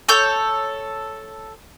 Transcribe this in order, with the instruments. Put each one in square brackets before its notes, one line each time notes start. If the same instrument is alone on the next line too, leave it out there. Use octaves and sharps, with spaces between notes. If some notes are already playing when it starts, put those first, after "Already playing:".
[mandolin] A4 C#5 G6